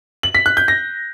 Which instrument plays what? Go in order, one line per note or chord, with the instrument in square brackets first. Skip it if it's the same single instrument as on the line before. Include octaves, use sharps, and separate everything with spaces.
[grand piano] F#7
B6
F#6
G6
A#6